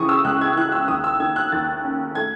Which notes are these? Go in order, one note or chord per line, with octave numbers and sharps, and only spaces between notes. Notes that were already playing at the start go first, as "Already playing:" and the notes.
Already playing: C#3 E3 C#6 D#6
E6
C#2 F#6
G#6
E3 F#6
E6
D#2 D#6
E6
D#3 G#6
F#6
D#2 A6
C#4
A3 G#6